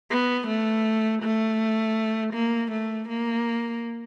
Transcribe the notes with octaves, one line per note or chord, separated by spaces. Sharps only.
B3
A3
A3
A#3
A3
A#3